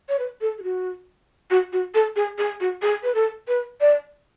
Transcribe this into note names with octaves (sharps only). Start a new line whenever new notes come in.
C#5
B4
A4
G#4
F#4
F#4
F#4
A4
G#4
G#4
F#4
G#4
B4
A4
B4
D5